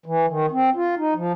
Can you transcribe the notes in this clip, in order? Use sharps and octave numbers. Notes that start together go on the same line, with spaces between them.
E3
D#3
C4
F4
D#4
F3